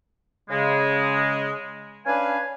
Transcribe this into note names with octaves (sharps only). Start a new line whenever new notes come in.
C#3 G#3
C#4 D4 B4 F5 G#5